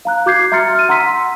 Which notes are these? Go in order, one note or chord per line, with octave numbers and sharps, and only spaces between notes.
F5 A#5 F#6
F#4 D6 G6 G#6 C7
E5 A#5 C6 F6 A6 C#7
F6 D#7
F#5 A#5 C6 E6 B6